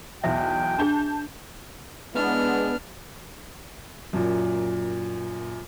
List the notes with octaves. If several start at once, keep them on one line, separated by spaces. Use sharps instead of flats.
B1 E2 E5 G5
D4 G#4 A5 G6
G#3 B3 D4 E4 F6
F#2 A#2